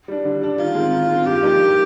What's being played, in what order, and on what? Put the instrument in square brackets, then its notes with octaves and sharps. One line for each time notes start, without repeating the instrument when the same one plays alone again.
[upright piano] G3 D4
D3
G3 D4
[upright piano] D#3 [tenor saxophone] F4
[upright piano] G#3 C4
D#3
G#3 C4
[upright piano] G2 [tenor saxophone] G4
[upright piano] F3 A#3 D#4
G2